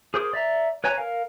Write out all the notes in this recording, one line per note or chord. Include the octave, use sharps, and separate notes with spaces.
G#4 A#4 C5 D6 D#6
D5 E5 A#5
B4 C#5 G#5 A#5
A#4 F5